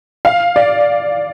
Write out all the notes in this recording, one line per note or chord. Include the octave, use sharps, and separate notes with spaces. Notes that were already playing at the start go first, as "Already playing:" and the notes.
F5
D5